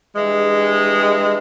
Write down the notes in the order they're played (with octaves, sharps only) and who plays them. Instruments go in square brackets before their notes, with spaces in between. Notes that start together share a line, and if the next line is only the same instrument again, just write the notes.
[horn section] G2 E3 G#3